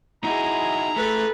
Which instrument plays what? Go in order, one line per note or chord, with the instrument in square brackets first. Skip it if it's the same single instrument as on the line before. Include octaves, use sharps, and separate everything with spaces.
[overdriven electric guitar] D#4 F#4 [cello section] E4 G#4 [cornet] A#5
[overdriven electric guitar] A3 [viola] A4 B4